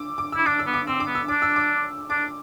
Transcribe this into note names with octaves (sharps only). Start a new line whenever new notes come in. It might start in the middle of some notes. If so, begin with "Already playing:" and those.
Already playing: D6 E6
D6
E4 E6
D4 D6
E6
B3
D6
C4 E6
D6
B3
E6
D4 D6
E6
D6
D4 D6